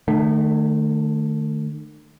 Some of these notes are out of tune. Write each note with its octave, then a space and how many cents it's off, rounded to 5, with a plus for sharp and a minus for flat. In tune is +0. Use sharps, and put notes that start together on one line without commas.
D#3 -45 A3 +0